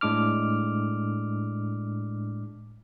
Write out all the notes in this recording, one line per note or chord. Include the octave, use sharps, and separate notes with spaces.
A2 G#3 D4 D6 F6